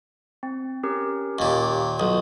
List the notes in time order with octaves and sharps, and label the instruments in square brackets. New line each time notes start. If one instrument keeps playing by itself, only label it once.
[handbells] C4
C#4 G4 A#4
[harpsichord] D#2 A#2
[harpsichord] B1 [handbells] F4 D#6